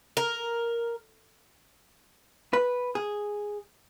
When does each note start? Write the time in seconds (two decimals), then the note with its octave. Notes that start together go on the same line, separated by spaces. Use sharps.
0.17 A#4
2.53 B4
2.95 G#4